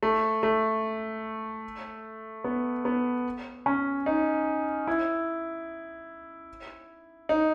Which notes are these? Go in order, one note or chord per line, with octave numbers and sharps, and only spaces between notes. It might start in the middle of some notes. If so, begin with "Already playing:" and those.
A3
A3
B3
B3
C#4
D#4
E4
D#4